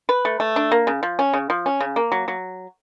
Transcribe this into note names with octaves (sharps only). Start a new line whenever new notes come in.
B4
A3
A3
D4
A#3
C#3
F3
C#4
C#3
F3
C#4
C#3
A#3
F#3
F#3